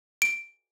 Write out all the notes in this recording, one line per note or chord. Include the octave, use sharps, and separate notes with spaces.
D7